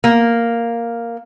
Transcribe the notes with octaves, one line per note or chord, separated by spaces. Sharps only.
A#3